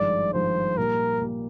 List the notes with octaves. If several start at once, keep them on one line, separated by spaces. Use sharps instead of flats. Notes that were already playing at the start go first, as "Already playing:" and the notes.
Already playing: G#1 G2 F3 G#3 D5
G#1 G2 F3 G#3 C5
A#2 G3 A#3 A#4
A#2 G3 A#3